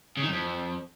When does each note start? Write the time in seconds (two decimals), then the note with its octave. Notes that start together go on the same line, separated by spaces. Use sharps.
0.17 C#3
0.22 D#3
0.27 F#2
0.33 F2